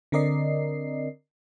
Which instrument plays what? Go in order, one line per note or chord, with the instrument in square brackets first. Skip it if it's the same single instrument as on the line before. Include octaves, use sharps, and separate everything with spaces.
[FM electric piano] D3 C4 A#4 D5 D#5 C7